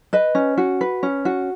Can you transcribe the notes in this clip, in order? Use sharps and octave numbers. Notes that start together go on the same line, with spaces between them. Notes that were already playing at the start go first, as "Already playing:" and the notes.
B4 D#5
C#4
F#4
B4
C#4
F#4